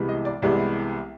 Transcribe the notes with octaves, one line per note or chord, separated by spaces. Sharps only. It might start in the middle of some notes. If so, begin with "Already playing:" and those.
Already playing: C2 C3 E3 G#3 B3
D#5
D5
C2 C3 E3 G#3 B3 D5